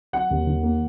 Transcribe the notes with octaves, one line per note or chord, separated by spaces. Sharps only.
F#3 F#5
D#2
D#3
A#3